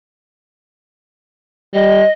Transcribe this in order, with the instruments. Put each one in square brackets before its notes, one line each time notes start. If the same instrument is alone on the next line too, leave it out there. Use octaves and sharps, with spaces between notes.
[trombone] G3 [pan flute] D#5